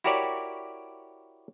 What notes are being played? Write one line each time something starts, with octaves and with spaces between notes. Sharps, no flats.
E4 F#4 G4 A#4 C#5 D5